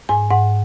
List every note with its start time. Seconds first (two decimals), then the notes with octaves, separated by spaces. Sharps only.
0.09 G#2 G#5
0.30 G#2 F#5